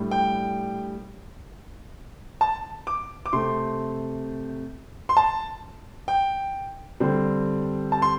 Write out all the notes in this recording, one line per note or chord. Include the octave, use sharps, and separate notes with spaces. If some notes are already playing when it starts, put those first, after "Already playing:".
Already playing: A2 G3 D4
G5
A5
D6
D6
C3 A3 C4 C6
C6
A5
G5
D3 G3 C4
A5
C6